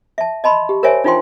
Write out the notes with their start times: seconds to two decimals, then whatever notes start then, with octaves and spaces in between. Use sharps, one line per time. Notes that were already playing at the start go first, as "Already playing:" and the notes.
0.18 E5 A5
0.44 D#5 A5 B5 C6
0.69 G4
0.83 A#4 C5 C#5 E5 G#5
1.04 D4 D#4 F4 C5 G5 C6